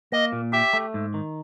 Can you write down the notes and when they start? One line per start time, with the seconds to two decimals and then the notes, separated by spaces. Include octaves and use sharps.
0.12 A#3 D#5
0.33 A#2
0.53 G4 E5
0.73 A3
0.94 G#2
1.14 D#3